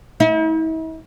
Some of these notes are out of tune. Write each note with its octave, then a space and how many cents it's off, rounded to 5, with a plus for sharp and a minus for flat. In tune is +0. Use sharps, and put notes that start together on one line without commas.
E4 -45